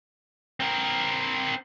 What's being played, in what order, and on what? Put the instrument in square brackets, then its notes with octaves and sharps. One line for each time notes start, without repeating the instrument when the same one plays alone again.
[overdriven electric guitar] C4 A#4